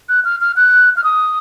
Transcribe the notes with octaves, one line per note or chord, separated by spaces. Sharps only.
F#6
F6
F6
F#6
F6
D#6